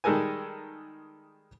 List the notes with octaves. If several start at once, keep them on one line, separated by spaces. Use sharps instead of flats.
D#3 G3 G#3 A4 A#4 G#5